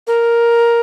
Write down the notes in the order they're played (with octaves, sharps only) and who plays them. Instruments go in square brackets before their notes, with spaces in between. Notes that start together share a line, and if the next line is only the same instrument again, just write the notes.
[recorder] A#4